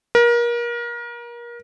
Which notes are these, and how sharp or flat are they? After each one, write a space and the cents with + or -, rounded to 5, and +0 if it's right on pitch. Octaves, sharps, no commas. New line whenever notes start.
A#4 +30